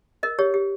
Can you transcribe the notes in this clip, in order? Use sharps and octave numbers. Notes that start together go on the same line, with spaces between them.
A#4 D#5
G4 C#5
G4